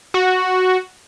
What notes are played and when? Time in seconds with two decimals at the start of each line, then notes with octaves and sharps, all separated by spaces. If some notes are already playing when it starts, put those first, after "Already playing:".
0.14 F#4